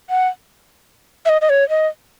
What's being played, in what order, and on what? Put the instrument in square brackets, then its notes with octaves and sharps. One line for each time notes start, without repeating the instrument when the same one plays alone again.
[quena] F#5
E5
D#5
D#5
C#5
D#5